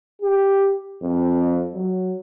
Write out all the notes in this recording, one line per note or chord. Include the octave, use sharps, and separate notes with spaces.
G4
F2
F#3